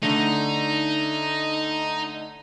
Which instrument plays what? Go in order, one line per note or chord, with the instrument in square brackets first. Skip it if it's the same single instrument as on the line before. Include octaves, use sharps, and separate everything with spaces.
[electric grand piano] D3 A3 [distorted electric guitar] D#4